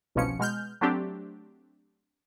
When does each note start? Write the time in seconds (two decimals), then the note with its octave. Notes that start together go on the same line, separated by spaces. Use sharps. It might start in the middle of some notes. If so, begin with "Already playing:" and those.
0.15 G1 C2 B2 F3 C#4 C#7
0.39 B2 G#3 F6 G6
0.81 F#3 A3 C4 D4 G4